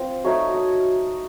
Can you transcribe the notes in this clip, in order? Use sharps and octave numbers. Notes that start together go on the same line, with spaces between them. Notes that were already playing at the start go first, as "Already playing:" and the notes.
Already playing: C4 F4 C5
F#3 A3 D#4 C#5
D#5